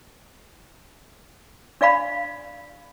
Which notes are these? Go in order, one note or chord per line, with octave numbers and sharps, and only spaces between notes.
D4 D5 F5 B5